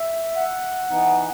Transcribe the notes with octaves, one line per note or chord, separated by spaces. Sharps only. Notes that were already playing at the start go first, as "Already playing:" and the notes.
Already playing: E5
F#5
E3 B3 D#4